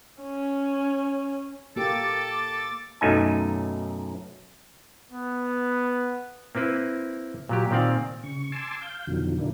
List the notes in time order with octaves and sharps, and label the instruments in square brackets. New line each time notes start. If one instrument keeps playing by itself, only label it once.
[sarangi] C#4
[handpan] A#3 G4 [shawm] A4 [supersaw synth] D6 A6
[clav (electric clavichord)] B1 F#2 A3 D#4 G#5
[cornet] B3
[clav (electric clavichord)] A#3 C4 E4 B4
A#2 F#3 G4
A#2 D#3 C4 D5 F5
[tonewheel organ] C#3 C#6
G#5 A5 C6 D6 E6
F5 G6
F2 B2 D3 D#3 F3 F#3
A#2 D3 F#3 A#3 D4 E4